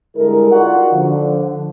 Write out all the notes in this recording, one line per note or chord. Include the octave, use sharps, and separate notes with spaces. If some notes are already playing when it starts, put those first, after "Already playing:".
D3 G3 G#3 E4 A4 A#4
D#4 F4 F#4 D5 F#5
D3 F3